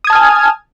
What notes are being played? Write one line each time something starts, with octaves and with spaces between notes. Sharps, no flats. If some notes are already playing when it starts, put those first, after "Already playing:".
G#5 A5 D#6 F6 G#6